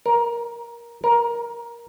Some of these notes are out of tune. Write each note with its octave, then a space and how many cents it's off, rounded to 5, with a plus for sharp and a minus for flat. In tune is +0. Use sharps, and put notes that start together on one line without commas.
A#4 +15
A#4 +15